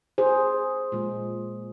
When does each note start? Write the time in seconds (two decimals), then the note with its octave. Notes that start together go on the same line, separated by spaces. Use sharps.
0.18 G#4 C5
0.92 A#2 G#3